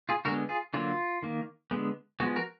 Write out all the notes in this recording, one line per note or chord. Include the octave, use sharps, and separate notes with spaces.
F4 G#4
D3 G#3 B3 F#4 A#4
F4 G#4
D3 F#3 A#3 F4
D#3 A#3
D3 G#3 B3
F3 G#3 B3 F#4
F#4 A#4